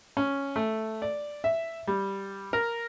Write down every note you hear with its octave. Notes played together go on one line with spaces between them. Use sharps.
C#4
A3
D5
E5
G3
A#4